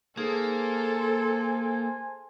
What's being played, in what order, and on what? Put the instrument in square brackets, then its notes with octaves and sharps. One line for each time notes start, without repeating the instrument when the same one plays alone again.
[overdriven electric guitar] A#3 [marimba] D#4 G#4 D#6 [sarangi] A4 [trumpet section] C5 G#5 A5